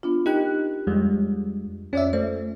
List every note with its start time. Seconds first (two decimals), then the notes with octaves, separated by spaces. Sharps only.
0.03 B3 D4 F4
0.26 D#4 G4 A#4 G5 F#6
0.87 F2 G3 G#3
1.93 F2 C#4 D5 E5
2.13 A3 C5